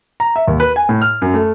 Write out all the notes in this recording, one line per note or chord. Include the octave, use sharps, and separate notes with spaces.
A#5
E5
D#2
B4
G#5
A2
F6
F#2
A3